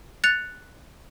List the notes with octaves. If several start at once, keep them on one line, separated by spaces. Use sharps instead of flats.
F#6 A6 C#7 F7